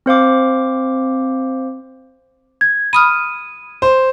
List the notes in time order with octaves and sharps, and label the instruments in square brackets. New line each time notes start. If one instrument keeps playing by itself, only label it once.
[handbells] C4 C5 F5 D6
[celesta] G#6
[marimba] B5 D#6 F6 [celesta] D#7
[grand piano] C5